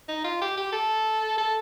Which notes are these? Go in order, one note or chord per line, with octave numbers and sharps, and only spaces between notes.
D#4
F4
G4
G4
A4
A4